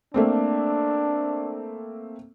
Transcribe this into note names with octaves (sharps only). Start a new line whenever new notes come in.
A3 A#3 C4 D4